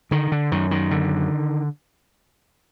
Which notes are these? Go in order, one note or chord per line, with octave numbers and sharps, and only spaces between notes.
D3 D#3
D3
F#2 D#3
D#3
D3